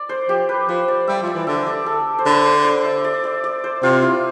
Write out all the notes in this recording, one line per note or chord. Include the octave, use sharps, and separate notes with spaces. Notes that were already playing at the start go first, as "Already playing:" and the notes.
Already playing: D5
C5
F3 G4
B4
F3 C5
D5
G3 E5
F3
D5
E3
D3 E5
D5
A4
C5
D3 B4
C5
D5
E5
D5
D5
D5
C5
C3 F4
E4